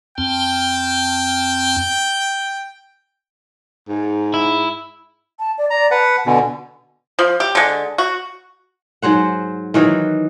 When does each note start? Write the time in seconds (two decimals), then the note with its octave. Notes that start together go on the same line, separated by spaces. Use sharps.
0.18 F2 C4 G5 A5
3.89 G#2
4.34 E4
5.40 A5
5.58 D5
5.70 D5 A#5
5.91 B4 F#5 A5
6.26 B2 D3 G#5
7.19 F3
7.40 G4
7.55 D3 G#3
7.98 F#4
9.02 G#2 F#3 C5 F#5
9.74 D#3 E3 F#3